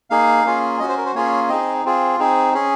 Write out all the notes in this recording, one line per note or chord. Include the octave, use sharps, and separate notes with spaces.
A#3 D#4 G#4 F5
A#3 C#4 F4 G#4
C#4 F#4 D#5
C5
A#4
C5
A#3 C#4 F4 G#4 C#5
C4 D#4 G#4 D#5
C4 F4 G#4
C4 D#4 G#4
C#4 G#4